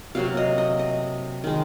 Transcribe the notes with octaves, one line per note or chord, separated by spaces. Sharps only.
C3 F#3 A#3 F5
D#5
D#5
D#5
D#3 G#3